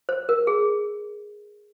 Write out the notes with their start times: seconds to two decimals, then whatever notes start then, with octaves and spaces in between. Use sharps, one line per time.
0.09 C5
0.29 A#4
0.47 G#4